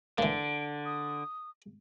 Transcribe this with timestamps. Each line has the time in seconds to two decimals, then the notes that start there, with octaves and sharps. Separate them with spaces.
0.18 D3 E3 A#3 D7
0.85 D#6